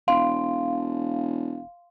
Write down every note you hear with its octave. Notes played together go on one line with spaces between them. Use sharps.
E1 F5 C6